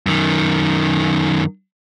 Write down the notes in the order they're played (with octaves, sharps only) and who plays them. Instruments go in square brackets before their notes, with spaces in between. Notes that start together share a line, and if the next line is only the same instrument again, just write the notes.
[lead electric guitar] F#2 D#3